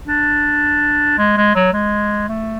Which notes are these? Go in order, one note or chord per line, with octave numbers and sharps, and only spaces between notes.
D4
G#3
G#3
F#3
G#3
A3